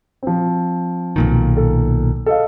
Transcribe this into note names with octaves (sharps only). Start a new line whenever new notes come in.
F3 C4
B1 A#2 D#3
A4
A4 D#5 F5